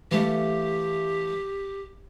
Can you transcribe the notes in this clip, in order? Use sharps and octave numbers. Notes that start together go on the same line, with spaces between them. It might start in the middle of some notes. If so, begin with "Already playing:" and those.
E3 A3 G4 F5